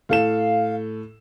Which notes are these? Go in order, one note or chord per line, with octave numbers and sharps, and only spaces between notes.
A2 A4 F5 E7